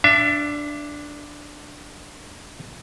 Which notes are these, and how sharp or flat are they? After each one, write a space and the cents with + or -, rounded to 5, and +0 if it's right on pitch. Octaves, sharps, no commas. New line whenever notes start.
D4 +0 E5 +35